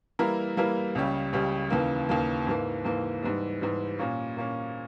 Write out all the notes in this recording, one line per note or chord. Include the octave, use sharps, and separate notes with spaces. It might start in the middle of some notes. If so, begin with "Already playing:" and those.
E3 G3 A#3 E4 A#4
E3 G3 A#3 E4 A#4
C#2 C#3 G3 C#4 G4
C#2 C#3 G3 C#4 G4
D#2 C#3 E3 A#3
D#2 C#3 E3 A#3
G#2 E3 A#3
G#2 E3 A#3
G#2 E3 G3
G#2 E3 G3
A#2 A#3 C#4
A#2 A#3 C#4